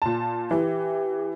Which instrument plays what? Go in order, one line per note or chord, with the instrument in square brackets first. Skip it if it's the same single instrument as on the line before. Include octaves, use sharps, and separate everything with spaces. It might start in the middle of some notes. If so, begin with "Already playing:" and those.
[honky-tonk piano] A#2 A5
[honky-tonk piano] E3 [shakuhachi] G4